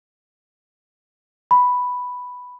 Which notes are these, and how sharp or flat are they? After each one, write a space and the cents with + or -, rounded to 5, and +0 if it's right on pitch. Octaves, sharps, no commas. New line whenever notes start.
B5 +0